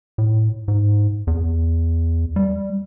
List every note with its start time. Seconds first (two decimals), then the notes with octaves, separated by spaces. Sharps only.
0.18 A2
0.68 G#2
1.27 E2
2.36 G3